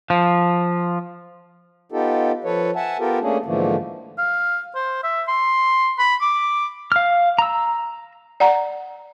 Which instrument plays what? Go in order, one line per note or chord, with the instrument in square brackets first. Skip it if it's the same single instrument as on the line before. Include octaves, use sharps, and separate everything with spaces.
[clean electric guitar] F3
[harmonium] B3 D#4 F4 G4 A4
F3 A4 B4 C#5
E5 F#5 G#5 A5
B3 F4 G4 A4 A#4
A3 A#3 C#4 D4 G#4
G#2 D3 E3 F3 A3 A#3
[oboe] F5
C5
E5
C6
B5
D6
[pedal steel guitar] F5 F6
A#5 E6
[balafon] D5 F#5 A#5